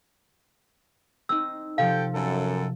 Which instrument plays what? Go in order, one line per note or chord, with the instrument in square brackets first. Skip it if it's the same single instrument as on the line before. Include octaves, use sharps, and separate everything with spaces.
[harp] C4 D#4 [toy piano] E6
[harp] C3 F3 [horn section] A4 G5 [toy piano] F5
[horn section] F#2 A4